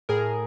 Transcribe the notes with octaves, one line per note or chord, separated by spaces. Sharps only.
A2 G#4 A#4